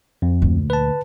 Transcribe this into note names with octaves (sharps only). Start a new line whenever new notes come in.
F2
D2 A#2
B4 A5